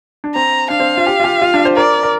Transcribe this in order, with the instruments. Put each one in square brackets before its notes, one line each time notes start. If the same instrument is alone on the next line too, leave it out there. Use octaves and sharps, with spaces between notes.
[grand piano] D4
[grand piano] C4 [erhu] A#5
[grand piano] D4 [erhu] F5
[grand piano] C4
F4
G4
F4
G4
F4
D4
C5
[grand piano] A#4 [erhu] D5
[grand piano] A#4